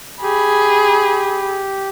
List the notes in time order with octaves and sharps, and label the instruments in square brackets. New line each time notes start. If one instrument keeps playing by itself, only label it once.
[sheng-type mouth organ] G4 [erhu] G#4 [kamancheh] B5